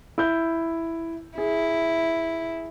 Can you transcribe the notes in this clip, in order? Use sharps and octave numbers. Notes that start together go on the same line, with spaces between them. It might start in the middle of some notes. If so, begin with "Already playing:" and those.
E4 G6
E4 G#4